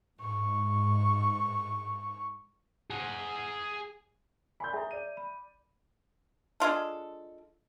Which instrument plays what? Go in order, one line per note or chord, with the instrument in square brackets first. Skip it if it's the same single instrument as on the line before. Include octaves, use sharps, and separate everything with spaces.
[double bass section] G#2 [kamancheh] C#6
[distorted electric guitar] G#4 F#5
[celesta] D5 G#5 [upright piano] B5 C6 G6
[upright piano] G#4 A#5 [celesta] E5
[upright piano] D5 D#7
[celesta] B5
[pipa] G#3 D4 F4 A4